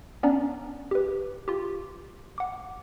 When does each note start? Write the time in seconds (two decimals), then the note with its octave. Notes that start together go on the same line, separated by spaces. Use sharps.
0.23 B3 C#4 D4 D5 A#5
0.91 G4 B4
1.48 F4 G4
2.38 F#5 D6